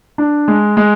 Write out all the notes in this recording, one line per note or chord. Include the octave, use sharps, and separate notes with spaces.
D4
G#3
G#3